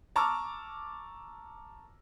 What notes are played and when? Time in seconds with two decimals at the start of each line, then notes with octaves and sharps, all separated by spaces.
0.16 A5 A#5 C#6 D6 E6 F6